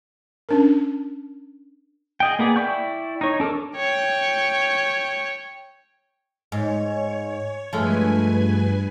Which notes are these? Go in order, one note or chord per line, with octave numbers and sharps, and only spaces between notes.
C#4 D4 A#4
G#4 D#5 G5
A#3 B3 G#4 D5
E4 D5 G5 C#6 G6
D#4 C#5
D4 A4 A#4 D6
C#5 G5
G#2 C#5
G2 F3 G#3 A3 B4 G#5